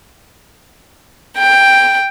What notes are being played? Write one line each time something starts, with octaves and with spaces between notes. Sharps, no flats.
G5